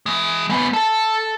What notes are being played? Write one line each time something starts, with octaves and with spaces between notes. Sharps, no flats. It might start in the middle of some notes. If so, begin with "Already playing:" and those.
E3 G#3
G#3 B3
A4 A5